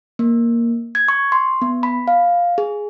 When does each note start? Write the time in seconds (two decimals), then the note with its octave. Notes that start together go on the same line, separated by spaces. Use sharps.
0.19 A#3
0.95 G#6
1.08 C#6
1.32 C6
1.62 B3
1.83 B5
2.08 F5
2.58 G#4